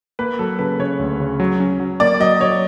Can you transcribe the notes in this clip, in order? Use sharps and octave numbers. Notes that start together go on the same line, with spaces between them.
A#3 B4
F#3 A4
C#3 B4
C#3 C#5
D2
C#3
F#3
C#4
F#3
A#3 D5
F#3 D#5
F#3 C#5